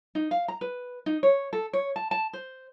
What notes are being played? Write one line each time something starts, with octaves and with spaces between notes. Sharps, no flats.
D#4
F5
A#5
B4
D#4
C#5
A4
C#5
A5
A5
C5